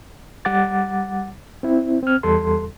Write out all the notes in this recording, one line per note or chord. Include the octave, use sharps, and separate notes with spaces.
G3 F#5 D6 A6
C4 E4
C4 F6
E2 G3 A4 C6